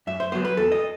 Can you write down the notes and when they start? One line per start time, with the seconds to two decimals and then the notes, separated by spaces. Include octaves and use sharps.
0.07 F#2 E5
0.20 C5
0.32 F#3 B3 C5
0.45 B4
0.57 E2 A4
0.72 D#5